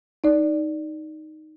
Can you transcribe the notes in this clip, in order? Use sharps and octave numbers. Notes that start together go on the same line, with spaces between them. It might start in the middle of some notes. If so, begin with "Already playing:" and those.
D#4 D5